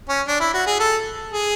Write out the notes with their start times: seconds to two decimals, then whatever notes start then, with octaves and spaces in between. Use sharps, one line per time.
0.09 C#4
0.27 D4
0.40 E4
0.54 F#4
0.66 G#4
0.80 A4
1.33 G#4